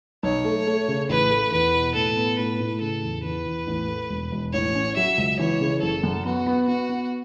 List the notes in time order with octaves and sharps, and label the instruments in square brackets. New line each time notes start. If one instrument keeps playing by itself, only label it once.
[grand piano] B1 [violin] C#5
[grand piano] A3
A3
C#3
[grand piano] A1 [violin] B4
[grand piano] A3
[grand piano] E2 [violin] B4
[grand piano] B2
[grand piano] A2 [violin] A4
[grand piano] B3
[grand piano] A2 [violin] B4
[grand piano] A2
[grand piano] C#3 [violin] A4
[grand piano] E2
[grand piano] E2 [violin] B4
[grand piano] E2
A1
A3
E1
E1
[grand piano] A1 [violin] C#5
[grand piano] C#4
[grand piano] F#3 [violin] E5
[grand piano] C#2
[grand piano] E3 [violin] C#5
[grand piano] C#3
[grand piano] F#1 [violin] A4
[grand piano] F#2
[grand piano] B3 [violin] F#4
[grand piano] B3
[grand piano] B3 [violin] F#4
[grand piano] B3